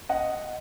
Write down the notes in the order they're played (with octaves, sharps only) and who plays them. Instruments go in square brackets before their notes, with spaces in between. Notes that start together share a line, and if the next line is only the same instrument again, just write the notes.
[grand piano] D#5 F#5